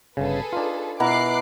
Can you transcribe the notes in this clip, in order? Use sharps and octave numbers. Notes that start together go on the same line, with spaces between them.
G1 C#3 G#4 A4 B4
D4 D#4 F4
B2 E4 A#5 D6 F#6 C7